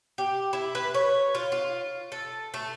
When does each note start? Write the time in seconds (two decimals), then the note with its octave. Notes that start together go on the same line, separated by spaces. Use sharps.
0.18 G4
0.53 E4
0.75 B4
0.94 C#5
1.35 F4
1.52 F4
2.12 A4
2.54 A3